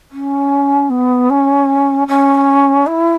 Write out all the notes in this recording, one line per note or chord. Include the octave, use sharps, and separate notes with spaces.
C#4
B3
C#4
C#4
E4